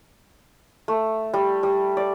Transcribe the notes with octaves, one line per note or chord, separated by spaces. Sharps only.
A3
G3
G3
D5